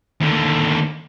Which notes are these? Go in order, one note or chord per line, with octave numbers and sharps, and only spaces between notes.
D#2 D3